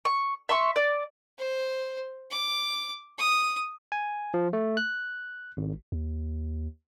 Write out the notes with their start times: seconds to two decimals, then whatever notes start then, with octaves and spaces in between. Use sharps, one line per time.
0.05 C#6
0.49 E5 C6 C#6
0.76 D5
1.38 C5
2.30 D6
3.18 D#6
3.92 G#5
4.34 F3
4.53 A3
4.77 F#6
5.57 G#1
5.92 D#2